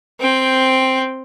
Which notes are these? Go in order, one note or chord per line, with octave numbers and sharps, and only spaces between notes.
C4 G5